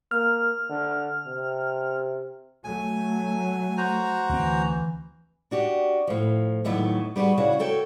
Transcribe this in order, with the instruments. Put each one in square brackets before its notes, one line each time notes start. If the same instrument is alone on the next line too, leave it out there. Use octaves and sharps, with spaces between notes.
[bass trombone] A#3 [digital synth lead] F6
[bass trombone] D3
C3
[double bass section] F#3 A3 [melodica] G#5
[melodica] F#4 C5 A#5
[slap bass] D2 C4 [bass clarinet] E3
[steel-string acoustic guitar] D4 F#4 G4
A2 F3
D#2 A2 F#3 A3 B3 E4
G3 B3 F4 F#4 G#4
C#3 D4 E4 F#4 C#5
F#4 A4 C#5 G5